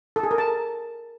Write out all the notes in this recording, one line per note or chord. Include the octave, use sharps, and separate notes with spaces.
A4
G#4
A#4
A5